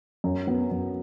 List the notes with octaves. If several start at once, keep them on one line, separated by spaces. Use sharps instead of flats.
F#2
F#3 B3
F#2